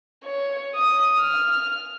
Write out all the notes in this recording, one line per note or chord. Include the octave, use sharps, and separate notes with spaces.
C#5
D#6
F6